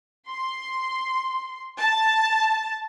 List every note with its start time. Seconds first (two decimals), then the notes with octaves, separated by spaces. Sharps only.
0.28 C6
1.80 A5